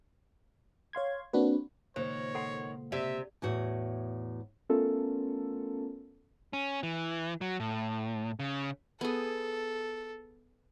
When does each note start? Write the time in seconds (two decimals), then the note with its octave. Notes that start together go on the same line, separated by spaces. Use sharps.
0.93 C#5 F5 C6 G#6
1.33 A#3 C4 D4 F#4 B4
1.96 C#2 A#2 D#3 C5 C#5
2.35 A4 F#5 C6
2.92 C3 D5 E5
3.42 E2 A2 F#4
4.69 A3 B3 C#4 F4 A4 A#4
6.53 C#4
6.83 E3
7.41 F#3
7.60 A2
8.39 C#3
9.01 B3 G#4 A4